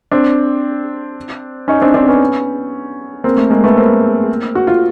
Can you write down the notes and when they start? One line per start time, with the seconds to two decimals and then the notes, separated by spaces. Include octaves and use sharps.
0.12 C4 D4
1.68 C#4 D#4
1.81 C4 D4
1.94 C4 D4
2.08 B3 C#4
3.24 A#3 C4
3.37 A3
3.50 G#3 A#3
3.64 A3 B3
3.77 A#3 C4
4.55 F#4
4.67 F4